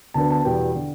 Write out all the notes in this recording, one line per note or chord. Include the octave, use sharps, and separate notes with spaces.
D2 D3 B3 A5
A5
E2 B2 G3 B3 G5
D3